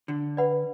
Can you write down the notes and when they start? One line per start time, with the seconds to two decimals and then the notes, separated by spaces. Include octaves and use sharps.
0.08 D3
0.37 B4 D5 F#5 B5